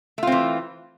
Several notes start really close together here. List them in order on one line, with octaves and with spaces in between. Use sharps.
A3 F4 C4 E3